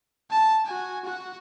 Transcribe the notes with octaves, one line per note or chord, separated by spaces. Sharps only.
A5
F#4 G#5
F#4 F#5